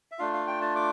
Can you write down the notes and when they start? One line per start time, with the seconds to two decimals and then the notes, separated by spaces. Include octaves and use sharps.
0.12 E5
0.19 A3 D4 F4 F5
0.33 F5
0.47 G5
0.61 A5
0.75 D6